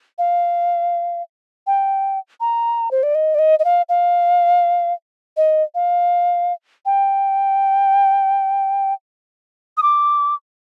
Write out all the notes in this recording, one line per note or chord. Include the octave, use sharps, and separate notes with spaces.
F5
G5
A#5
C5
D5
D#5
D5
D#5
D#5
F5
F5
D#5
F5
G5
D#6
D6